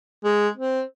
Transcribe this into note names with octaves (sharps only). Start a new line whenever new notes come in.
G#3
C4